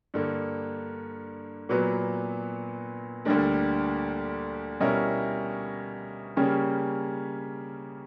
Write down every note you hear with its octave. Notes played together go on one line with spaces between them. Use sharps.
G2 D3 A#3
A#2 F#3 B3 F#4
D2 D3 G3 A#3 D4
B2 G3 C#4 E4 A#4
C#3 G3 A#3 C#4 G4